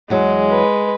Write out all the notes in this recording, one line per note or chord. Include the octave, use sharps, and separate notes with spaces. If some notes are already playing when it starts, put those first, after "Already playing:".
E2 F#3 G#3
B4